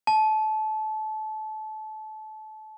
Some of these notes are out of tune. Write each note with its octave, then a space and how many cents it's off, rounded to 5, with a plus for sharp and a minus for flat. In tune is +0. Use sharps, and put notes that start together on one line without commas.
A5 -25